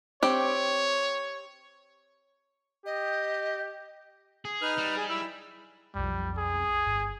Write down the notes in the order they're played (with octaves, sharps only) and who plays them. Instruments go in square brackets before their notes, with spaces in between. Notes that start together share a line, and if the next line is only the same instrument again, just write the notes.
[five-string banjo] C4 G4 [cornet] C#5
[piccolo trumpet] G4 [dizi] D#5
[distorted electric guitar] G#4
[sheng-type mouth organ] D#4 B4 F6
[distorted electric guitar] G3
[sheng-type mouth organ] G#4
E4 E6
[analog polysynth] B1 F2 [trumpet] G3
[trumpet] G#4
[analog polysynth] G1